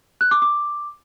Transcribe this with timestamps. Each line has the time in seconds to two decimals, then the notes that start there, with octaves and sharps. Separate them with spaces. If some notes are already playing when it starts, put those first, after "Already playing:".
0.21 F#6
0.31 D6
0.42 D6